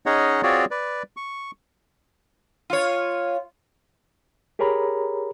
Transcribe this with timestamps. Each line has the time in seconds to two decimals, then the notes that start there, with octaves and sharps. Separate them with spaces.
0.06 C#4 D#4 G#4 C#5 D#5 F#5
0.43 C4 F4 F#4 G#4 C#5 D5
0.71 B4 D5
1.17 C#6
2.70 F4 C#5
4.59 G4 G#4 A#4 C#5 A#5 B5